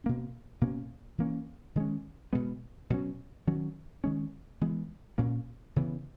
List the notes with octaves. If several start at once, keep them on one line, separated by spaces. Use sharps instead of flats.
B2 A#3 C#4
B2 A#3 C#4
E3 A#3 C#4
D#3 G#3 C#4
B2 G#3 B3
B2 F#3 C#4
D#3 F#3 C#4
D#3 G#3 C#4
E3 G#3 B3
A#2 A#3 C#4
C#3 E3 B3